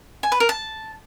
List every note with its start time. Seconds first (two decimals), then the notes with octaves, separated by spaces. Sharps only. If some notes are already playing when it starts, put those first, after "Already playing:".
0.23 G#5
0.32 B4
0.40 A#4
0.49 A5